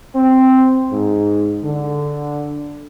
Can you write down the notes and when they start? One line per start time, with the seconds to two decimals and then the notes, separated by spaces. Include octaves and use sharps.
0.14 C4
0.91 G#2
1.63 D3